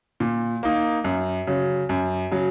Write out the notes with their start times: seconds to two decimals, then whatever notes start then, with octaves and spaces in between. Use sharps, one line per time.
0.20 A#2
0.63 A#3 D#4
1.04 F#2
1.47 C#3 F#3
1.89 F#2
2.31 C#3 F#3